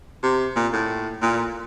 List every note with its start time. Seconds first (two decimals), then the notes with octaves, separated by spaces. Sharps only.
0.23 C3
0.56 A#2
0.73 A2
1.22 A#2